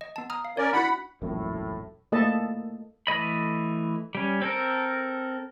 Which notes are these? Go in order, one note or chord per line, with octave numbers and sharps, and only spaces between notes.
D#5
B3 A5
A#5 D#6 F6
F5
C#4 A#4 C#5 D5
D4 E4 F#4 F#5 B5
E1 A#1 F#2 A2
A3 A#3 A4 D#5 E5 A5
E3 A3 D#5 B5
G3 C#4
C4 A4 A#4